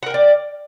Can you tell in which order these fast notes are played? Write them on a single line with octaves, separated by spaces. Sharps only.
F#5 A#4 G5 D5